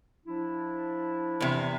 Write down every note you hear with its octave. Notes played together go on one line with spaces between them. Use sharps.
F3 D4 E4
E2 C3